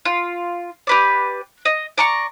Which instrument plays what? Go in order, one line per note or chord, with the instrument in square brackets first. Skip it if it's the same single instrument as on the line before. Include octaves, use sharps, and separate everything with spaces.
[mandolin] F4
G4 B4 D5
D#5
D5 A#5 C#6